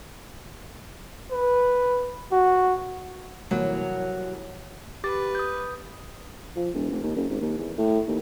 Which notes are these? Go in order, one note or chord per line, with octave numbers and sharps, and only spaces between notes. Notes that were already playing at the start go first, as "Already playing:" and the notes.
B4
F#4
C2 E3 F#3 A#3
G4 B4 D6 A6
D#6 G6
F3
E1
F1
D#2
F#1
G#1
D#2
E2
A2
D#2